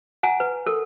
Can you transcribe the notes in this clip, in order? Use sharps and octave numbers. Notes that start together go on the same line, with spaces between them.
F#5 G#5 A#5
B4
A4 A#4